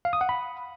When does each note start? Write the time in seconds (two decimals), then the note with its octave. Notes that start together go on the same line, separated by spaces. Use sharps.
0.05 F5
0.13 D#6
0.21 F#5
0.29 B5